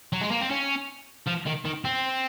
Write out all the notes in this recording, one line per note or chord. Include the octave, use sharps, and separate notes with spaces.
F#3
G#3
A#3
C4
C#4
F3
D#3
D#3
C4